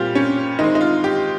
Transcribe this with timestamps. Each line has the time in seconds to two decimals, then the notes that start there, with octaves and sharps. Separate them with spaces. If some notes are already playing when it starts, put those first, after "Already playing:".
Already playing: A#2 G3 C4 F4 G4
0.15 C#4
0.59 D#3 G#3 C4 D#4
0.75 D#4
0.81 F4
1.04 G4